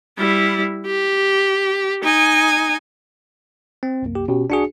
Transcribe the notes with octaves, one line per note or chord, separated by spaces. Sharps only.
G3 E4
G4
D#4 G#5
C4
C2 F#2 A#3
G4
B2 C#4 F#4 G4
B1 D4 F#4 G#4 C#7